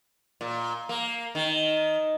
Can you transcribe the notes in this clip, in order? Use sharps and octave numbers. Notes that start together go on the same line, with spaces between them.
A#2
A#3
D#3